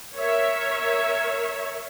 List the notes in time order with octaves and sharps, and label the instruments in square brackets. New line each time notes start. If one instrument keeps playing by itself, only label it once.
[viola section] A#4 C#5 E5